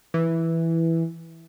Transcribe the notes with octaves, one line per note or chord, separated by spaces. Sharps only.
E3